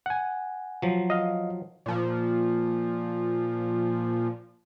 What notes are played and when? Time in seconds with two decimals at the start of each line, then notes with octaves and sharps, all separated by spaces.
0.06 F#5 G#5
0.82 F3 F#3
1.10 D#5 F5
1.86 A#2 F3